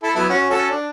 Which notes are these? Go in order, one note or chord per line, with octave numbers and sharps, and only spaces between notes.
E4 A4
F#3 B3 E4
C#4 F#4
C#4 F#4 A4
D4